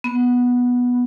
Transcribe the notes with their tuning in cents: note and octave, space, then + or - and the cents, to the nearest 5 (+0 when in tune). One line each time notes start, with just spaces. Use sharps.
B3 -5